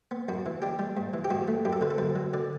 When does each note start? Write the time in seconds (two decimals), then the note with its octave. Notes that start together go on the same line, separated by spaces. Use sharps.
0.11 B3
0.29 F#2 F#4
0.46 E3
0.62 D4 G4
0.79 G3
0.97 G2
1.13 E3
1.24 G4
1.30 G2 F#4
1.48 A3
1.65 F#2 G4
1.73 A4
1.81 D3 B4
1.90 A4
1.98 F#2 B4
2.15 F#3
2.33 D3 D5